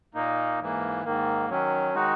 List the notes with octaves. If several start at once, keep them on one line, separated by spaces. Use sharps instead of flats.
A#2 A#3 D#4
G#2 E3 A#3
G#2 D#3 A#3
D#3 F#3 C#4
D#3 G#3 D#4 F#4